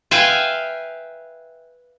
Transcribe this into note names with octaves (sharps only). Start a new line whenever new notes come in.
B4 E5 F5 G5 G#5